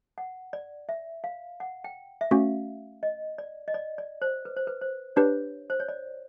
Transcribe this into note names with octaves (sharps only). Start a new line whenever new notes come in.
F#5
D5
E5
F5
F#5
G5
E5
A3 C#4 F#4 F5
D#5
D5
D#5
D5
D5
C5
B4
C5
B4
C5
D4 G4 B4 C#5
C5
C#5
D5